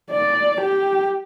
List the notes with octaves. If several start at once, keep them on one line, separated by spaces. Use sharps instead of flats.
D5
G4